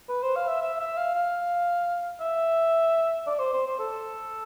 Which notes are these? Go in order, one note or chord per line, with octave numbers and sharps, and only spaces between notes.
B4
C5
F5
E5
E5
E5
F5
F5
E5
D5
C5
C5
C5
A4